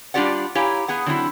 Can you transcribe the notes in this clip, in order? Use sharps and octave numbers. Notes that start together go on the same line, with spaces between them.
G3 D4 F4 G4 D5 F#5
E4 G4 C#5 F5 G#5 A#5
B3 G#4 F#5
D3 F#3 C4 D#4 E4